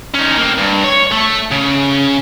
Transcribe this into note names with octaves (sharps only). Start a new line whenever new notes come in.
C#4 D#4
A#3 C4
G2
C#5
A3
C#3